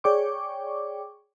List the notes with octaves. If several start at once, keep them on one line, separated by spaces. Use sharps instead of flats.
G#4 C#5 D5 G5 C#6 D6